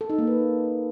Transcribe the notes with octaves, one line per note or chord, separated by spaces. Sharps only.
A4
D#4
A#3
B4